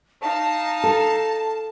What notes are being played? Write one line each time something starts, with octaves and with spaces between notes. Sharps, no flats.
D#4 F5 A5
A4